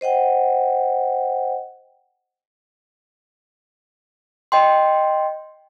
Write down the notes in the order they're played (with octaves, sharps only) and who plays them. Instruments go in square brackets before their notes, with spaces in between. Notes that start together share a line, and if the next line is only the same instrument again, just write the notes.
[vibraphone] C5 D#5 F#5 G5
[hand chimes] D#5 G5 C6